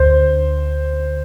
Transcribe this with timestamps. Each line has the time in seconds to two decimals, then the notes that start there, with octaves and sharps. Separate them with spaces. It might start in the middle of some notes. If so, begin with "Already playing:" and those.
Already playing: D2 D3 C5